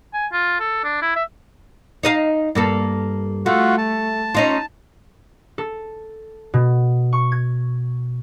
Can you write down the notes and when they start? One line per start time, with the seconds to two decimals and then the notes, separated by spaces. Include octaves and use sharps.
0.13 G#5
0.32 F4
0.60 A4
0.84 D4
1.02 E4
1.15 E5
2.03 D#4 D#5 F5
2.55 G2 A#3 A4
3.46 A3 F4 F#4
3.78 A5
4.35 C#4 D#4 F4
5.58 A4
6.54 B2
7.13 C#6
7.32 G#6